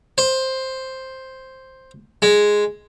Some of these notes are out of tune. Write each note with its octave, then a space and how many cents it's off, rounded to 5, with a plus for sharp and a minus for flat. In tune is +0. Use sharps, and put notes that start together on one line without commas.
C5 +5
G#3 +0